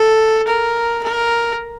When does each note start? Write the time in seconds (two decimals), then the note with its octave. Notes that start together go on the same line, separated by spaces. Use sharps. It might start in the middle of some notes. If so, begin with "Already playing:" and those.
Already playing: A4
0.48 A#4
1.03 A#4